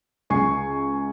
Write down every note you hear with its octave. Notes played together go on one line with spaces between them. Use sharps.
C#2 G#5 C#6 C7